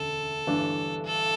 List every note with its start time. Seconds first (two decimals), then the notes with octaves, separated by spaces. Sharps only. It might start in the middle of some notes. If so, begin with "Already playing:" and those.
Already playing: E1 D2 D3 A3 C#4 A4
0.47 G1 G2 E3 A3 D4
1.06 A4